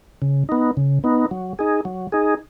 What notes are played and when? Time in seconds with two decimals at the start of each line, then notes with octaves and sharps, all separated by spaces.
0.22 C#3
0.49 B3 D#4
0.77 C#3
1.04 B3 D#4
1.31 F#3
1.59 D#4 G#4
1.85 F#3
2.12 D#4 G#4